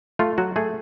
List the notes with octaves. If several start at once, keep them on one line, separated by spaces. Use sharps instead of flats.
A3 F4
F#3 F#4
A3 G#4